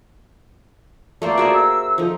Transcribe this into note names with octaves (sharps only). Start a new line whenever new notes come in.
A3 A#3 C5 D5
F#4 G#4 E5
E6
F3 D#4 A4